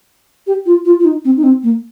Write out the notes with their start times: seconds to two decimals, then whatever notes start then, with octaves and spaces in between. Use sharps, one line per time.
0.47 G4
0.66 F4
0.85 F4
1.00 F4
1.05 D#4
1.25 C4
1.37 D#4
1.43 C4
1.63 A#3